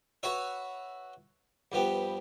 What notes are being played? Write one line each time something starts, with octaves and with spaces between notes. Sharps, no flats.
F#4 B4 C#5 E5
G2 F3 B3 G4